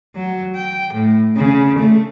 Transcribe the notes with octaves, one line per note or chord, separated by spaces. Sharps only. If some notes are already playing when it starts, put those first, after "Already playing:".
F#3
G5
A2
C#3
A3